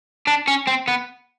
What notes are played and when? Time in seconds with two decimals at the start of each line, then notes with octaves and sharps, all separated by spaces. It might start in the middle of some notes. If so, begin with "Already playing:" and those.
0.27 D4
0.48 C#4
0.67 C4
0.88 B3